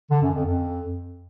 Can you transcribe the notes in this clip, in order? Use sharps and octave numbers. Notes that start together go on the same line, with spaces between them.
D3
F#2
F2
F2